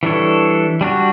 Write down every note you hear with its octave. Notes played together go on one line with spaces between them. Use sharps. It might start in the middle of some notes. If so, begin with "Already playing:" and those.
E3 G3 D4 A4 C#5
G3 D4 F#4